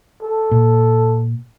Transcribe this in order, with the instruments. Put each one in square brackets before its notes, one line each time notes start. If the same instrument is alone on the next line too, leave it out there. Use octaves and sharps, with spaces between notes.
[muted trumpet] A4
[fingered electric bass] A#2